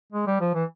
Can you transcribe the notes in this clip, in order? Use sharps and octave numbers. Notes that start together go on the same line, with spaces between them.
G#3
G3
F3
E3